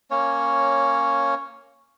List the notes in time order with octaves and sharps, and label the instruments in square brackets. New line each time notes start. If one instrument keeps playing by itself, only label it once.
[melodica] A#3 C#4 C#5